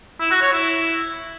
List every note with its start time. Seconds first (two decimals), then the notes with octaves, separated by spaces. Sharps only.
0.20 E4
0.31 F#4
0.42 C#5
0.52 E4